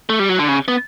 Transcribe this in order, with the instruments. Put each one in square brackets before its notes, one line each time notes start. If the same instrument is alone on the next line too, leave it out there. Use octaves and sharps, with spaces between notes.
[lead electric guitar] A3
G3
F#3
D3
C#3
B3